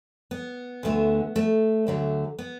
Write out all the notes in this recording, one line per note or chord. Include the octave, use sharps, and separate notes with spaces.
B3
D2 D3 A3
A3
D2 D3 F#3 A3
B3